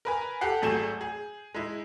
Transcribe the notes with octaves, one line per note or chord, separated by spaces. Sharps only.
A#4 B4 G#5 A#5
G4 A4 F#5 C7
G#1 F#3 A3 G#4 G6 E7
G#4
G#3 D#4 E4